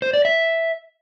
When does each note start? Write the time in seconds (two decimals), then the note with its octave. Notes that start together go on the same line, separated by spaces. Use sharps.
0.02 C5
0.13 D5
0.25 E5